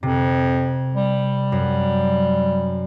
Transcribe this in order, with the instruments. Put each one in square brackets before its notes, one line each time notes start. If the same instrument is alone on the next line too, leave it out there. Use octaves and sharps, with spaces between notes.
[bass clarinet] F2 [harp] C3
[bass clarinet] G3
[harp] F#2